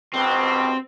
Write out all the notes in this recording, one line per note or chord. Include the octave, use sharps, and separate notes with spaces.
C#2 G2 B2 C4